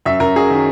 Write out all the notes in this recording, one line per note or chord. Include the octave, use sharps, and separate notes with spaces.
F#2 E5
F#2 A#4
F#3 G#4
D#3